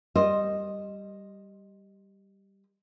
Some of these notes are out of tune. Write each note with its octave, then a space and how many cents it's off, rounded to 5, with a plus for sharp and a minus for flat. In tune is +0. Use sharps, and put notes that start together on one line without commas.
G3 +0 C5 +10 D#5 -5